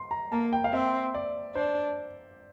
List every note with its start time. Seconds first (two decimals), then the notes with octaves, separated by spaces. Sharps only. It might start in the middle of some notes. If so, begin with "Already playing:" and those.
Already playing: C6
0.11 A#5
0.32 A#3 A5
0.53 G5
0.64 F5
0.73 C4 E5
1.14 D5
1.55 D4 C5